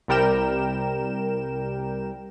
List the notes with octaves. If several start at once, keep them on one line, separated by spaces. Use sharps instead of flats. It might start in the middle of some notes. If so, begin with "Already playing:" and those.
C2 C3 G3 A#4 G5 E7